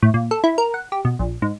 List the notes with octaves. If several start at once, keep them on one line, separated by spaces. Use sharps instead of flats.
A2
A#2
A4
E4
A#4
F#5
G4
B2
A#1
G#2